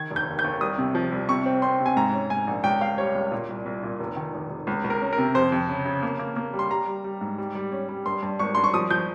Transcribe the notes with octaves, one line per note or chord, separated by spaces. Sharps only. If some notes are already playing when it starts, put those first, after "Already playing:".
Already playing: D#3 G#6
F1
G6
D#2
G6
D#2
C2 D#6
C3
F3
C2
C3 C#6
C4
C4 C6
C3
G#5
G#2 A#5
C#4
G#2 G#5
A#1
C#2 G5
C#2 F5
G3 C#5
C#2
A#2
C2
C2
A#2
F1
D#3
F1
F1
C#2
C#2
A#4
C#4
A#4
C3
F2 C5
F2
C#3
C#3
A#3
A#3
A#3
G3
C6
G3 A#5
G3
G3
G#2
G3
G3
C#4
G3
G2 C6
G2
G#1 C#6
G2 C6
C#6
F3 D#6
F3 G6